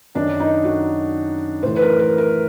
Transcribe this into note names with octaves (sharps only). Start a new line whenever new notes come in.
F#2 D#3 D4
D#4
F#4
A2 E3 C5
B4
A#4
A#4
A#4